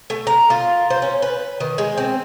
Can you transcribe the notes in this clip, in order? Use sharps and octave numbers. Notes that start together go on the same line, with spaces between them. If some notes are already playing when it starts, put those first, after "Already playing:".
A3
A#5
F4
C5
C#4
B4
D#3
G#3
C4